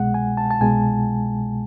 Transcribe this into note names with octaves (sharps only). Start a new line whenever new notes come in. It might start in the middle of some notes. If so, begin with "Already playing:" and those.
Already playing: C2 B2 G#3 F#5
G#5
A5
A5
C2 B2 G#3 G#5